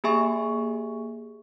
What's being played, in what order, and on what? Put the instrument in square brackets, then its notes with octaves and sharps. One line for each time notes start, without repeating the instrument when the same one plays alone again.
[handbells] A#3 G4 G#4 E5 G#5 C#6